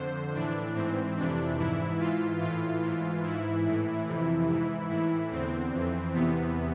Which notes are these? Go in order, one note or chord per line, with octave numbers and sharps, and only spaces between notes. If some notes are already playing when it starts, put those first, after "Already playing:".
Already playing: F2 D3 C5
A2 E3 D4
G#2 E3 C4
F2 C3 E3 D4
G#2 E3 E4
G#2 E3 F4
A2 E3 F4
G#2 E3
G#2 E3 E4
A2 E3
F2 C3 E3
G#2 E3
A2 E3 E4
E2 D3 C4
F2 E3
E2 C3 E3 B3